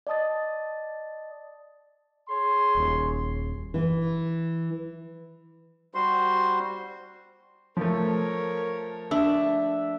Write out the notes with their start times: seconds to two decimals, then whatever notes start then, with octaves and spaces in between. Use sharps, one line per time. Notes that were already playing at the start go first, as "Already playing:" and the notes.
0.07 D5 D#5 A5 D#6 A6
2.29 G#4 C#5 C6
2.75 D#1
3.74 E3
5.94 G3 F#4 C5 C6
7.77 F3 A3 A#4 C#5
9.11 D4 E5